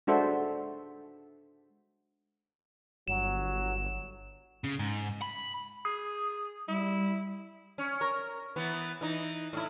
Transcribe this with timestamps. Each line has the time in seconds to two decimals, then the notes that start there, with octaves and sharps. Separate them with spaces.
0.07 G#3 D4 F#4 A4 C5 E5
3.08 G1 F#3 E7
4.64 C#3
4.79 G#2
5.22 B5
5.85 G#4 D#6
6.68 G3 E4
7.78 C#4
8.01 A#4
8.56 E3 B3
9.01 E3 D#4
9.53 A2 E4